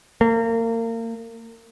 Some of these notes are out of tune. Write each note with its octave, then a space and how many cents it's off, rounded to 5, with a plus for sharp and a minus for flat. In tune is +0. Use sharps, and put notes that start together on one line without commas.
A#3 -30